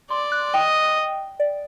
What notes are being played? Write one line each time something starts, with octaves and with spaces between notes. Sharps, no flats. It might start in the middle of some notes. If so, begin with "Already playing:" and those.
D5 C6
F#6
D#5 G5
D5